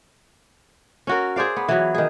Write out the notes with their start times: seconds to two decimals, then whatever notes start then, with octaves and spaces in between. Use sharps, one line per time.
1.07 C#4 F#4 A#4
1.36 G#4 C5 D5 F5
1.56 B3
1.69 E3 F#3
1.94 D#3 G#4